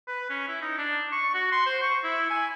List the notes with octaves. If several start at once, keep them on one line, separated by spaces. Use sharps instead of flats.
B4
C#4
E4
D#4
D4
C#6
F#4
C6
C5
C#6
E4
G#5